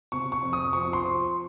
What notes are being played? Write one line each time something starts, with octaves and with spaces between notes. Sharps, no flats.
C3 C#6
C#6
F2
D#6
F3 C#6
C6
F3